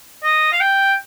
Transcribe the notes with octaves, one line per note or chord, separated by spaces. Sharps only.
D#5
F5
G5